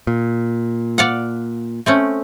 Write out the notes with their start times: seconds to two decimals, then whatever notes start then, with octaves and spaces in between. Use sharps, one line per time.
0.07 A#2
0.98 D5 F5 F#5
1.86 A3 C4 C#4